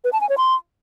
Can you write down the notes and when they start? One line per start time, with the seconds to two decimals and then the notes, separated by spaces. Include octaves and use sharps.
0.04 B4
0.13 A5
0.21 G#5
0.29 C#5
0.38 C6